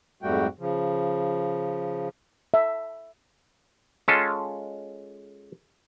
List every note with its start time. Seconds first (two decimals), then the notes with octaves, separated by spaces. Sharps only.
0.23 F2 G#2 G3 A3 F#4 G5
0.59 C#3 F3
2.54 E5
4.08 G#3 C#4 F4 A4